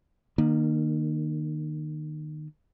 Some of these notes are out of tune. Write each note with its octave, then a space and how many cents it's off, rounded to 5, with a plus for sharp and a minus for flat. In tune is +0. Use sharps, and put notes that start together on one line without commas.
D#3 -30 A#3 +0